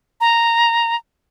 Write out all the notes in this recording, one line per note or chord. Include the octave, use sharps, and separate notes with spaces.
A#5